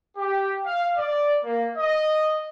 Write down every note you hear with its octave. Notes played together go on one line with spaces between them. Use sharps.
G4
F5
D5
A#3
D#5